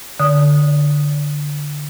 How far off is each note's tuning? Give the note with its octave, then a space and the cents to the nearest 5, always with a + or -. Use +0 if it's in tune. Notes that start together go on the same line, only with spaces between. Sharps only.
D3 +0 D5 -40 D#6 -10